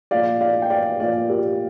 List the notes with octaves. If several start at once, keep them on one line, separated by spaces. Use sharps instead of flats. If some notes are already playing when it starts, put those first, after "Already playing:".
A#2 F3 D5 F5
D5 F5
G5
D5 F5
A#2 F3 D5 F5
G4 A#4